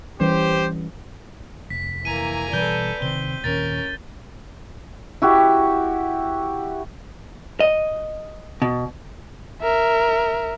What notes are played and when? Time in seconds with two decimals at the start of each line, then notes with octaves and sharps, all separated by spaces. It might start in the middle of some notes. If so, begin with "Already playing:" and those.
0.20 E3 G3 C#4 G4 C5
1.70 F1 B6
2.05 E3 A#3 G#5 A#5 D#7
2.53 B2 E3 G3 A4 B4 D5 G6 G7
3.02 C3 D#3 C4 G7
3.44 D#2 A#2 D#3 C#4 A#4 A6
5.22 E4 F#4 G4
7.60 D#5
8.62 B2
9.62 A#4 E5